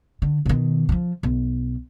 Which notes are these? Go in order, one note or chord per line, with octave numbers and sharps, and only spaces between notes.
D3
B2 D#3
D#3 F3
B1